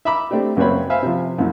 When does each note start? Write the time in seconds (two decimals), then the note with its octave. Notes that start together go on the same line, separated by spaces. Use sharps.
0.05 E5 A#5 B5 D6
0.31 A3 C4 D4 G4
0.57 C#2 F#2 A#3 C4 C#5 B5
0.90 C5 E5 F5 G#5 B5
1.03 C3 F3
1.38 C2 F#2